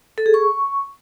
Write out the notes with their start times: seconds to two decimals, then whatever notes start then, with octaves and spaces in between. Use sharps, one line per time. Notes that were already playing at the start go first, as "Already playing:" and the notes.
0.18 A4
0.26 G#4
0.34 C#6